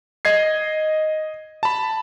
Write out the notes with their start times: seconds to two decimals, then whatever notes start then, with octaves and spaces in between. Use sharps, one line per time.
0.25 D#5 G#6 C7
1.63 A5 B5